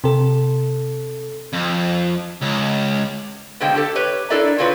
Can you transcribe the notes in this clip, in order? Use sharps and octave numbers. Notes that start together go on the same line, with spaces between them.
C3 A4
F2
C#2
B2 D3 G#3 C4 F5 G5
G4 A4
G4 B4 C#5
D4 E4 A4 A#4 D5 E5
A#2 C4 F4 B4 C#5 D5